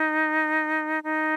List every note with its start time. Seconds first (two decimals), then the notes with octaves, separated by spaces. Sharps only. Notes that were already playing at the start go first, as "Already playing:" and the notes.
Already playing: D#4
1.03 D#4